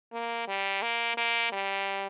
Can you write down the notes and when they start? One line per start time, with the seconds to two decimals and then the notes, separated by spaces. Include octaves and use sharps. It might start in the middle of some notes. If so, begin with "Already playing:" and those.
0.12 A#3
0.48 G3
0.82 A#3
1.17 A#3
1.52 G3